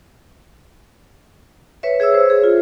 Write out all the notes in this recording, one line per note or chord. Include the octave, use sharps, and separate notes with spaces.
B4 C#5 E5
G#4 C#5 E5 E6
C5
G#4
F4